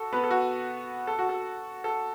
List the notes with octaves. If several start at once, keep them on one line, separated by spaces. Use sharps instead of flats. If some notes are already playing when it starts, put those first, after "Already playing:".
Already playing: F#4 A4
B3 B4
A4
F#4
A4
F#4
A4
A4